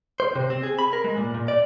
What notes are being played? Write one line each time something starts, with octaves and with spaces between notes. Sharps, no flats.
C5
C3
C4
G#4
B5
A#4
G#3
A#2
A#2
D5